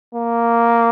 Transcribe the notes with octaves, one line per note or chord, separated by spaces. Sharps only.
A#3